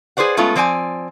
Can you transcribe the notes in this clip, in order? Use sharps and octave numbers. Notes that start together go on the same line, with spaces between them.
G#4 B4 C5 D5 F#5
G#3 A3 B3 C#4 F4
F3 C4 D5 G5 G#5